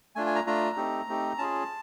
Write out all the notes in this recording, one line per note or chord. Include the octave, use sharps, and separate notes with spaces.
A3 D4 F4 G#5
G#5
A#5
A3 D4 F4 A#5
A3 C4 D#4 G4
A3 C4 D#4 G4
C#4 F4 G#4 A5